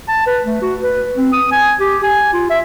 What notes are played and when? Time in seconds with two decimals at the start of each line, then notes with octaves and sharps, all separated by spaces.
0.08 A5
0.27 B4
0.44 A3
0.62 F#4
0.82 B4
1.16 C4
1.33 D#6
1.52 G#5
1.80 G4
2.03 G#5
2.33 F4
2.50 E5